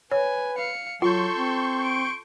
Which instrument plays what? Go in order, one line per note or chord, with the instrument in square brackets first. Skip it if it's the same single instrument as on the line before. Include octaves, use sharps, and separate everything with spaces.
[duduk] B4 [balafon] C#5 [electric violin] G#5
[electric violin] F5 C#7
[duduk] F#3 [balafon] F4 [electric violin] A4 [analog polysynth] C6 C#6 G6
[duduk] C4
[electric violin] D7